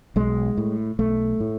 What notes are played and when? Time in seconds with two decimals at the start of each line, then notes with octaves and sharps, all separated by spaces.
0.16 B1 G#3
0.58 A2
0.99 B1 A3
1.40 A2